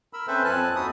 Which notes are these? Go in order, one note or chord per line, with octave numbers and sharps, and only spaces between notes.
A#4 B5 E6
C4 C#4 A4 B4 C5 E5
F2 F3 C4 G#5 A5 F#6
D#2 D#4 F#4 A4 B5 D#6